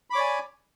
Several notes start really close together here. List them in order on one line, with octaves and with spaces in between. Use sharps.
B5 D6 C#5 D5 G#5